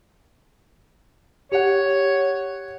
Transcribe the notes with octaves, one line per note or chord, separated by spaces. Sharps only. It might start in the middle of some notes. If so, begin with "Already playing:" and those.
G4 C#5 F#5